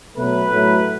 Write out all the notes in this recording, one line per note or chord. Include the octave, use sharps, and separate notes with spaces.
B2 F#3 A3 B4
A2 F#3 A3